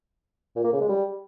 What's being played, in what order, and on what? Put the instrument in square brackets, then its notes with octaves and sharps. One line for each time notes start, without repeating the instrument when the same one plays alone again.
[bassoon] A#2
A#3
C#3
G#3
G3